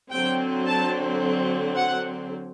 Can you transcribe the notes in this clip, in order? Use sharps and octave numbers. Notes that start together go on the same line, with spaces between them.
D3 F#3 C4 G5
A5
F#5